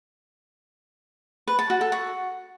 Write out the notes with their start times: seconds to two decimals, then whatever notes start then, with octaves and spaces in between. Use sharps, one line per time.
1.48 B4
1.59 A5
1.70 F#4
1.81 A4
1.92 F#4